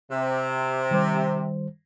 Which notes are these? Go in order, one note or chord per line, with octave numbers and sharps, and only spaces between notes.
C3
D#3 G3 C5